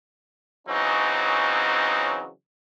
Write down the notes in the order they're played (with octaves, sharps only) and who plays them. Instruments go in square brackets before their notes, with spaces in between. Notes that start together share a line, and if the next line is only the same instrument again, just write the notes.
[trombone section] C#3 E3 F#3 C4 C#4 D#4